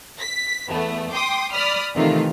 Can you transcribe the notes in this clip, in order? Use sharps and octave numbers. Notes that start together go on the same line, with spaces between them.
B6
E2 A3 B3
G5 C6 D6 D#6
D5 B5 D#6 F6
C3 D#3 E3 A3 F4